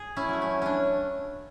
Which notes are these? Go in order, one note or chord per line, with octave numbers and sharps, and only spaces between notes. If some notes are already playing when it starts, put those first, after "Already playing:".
Already playing: G#4
C#4 E4
F#3 A3
C#4
C#4 D4